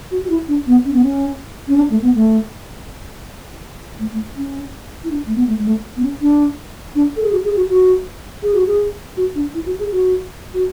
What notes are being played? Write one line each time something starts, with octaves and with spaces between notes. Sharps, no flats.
F#4
F#4
E4
D4
B3
C#4
B3
C#4
C#4
D4
A3
B3
A3
A3
A3
C#4
E4
D4
A3
B3
A3
G#3
A3
B3
C#4
D4
D4
A4
G#4
F#4
G#4
F#4
F#4
G#4
F#4
G#4
F#4
D4
E4
F#4
G#4
F#4
F#4